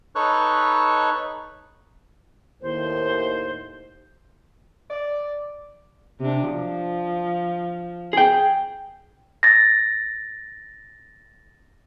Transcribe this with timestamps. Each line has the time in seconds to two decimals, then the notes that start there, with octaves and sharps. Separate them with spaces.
0.15 D#4 A4 B4 C#5 C#6 F#6
2.62 D#2 A2 C5
4.91 D5
6.20 C3 D4
6.51 F3
8.13 G#4 G5
9.43 A6 A#6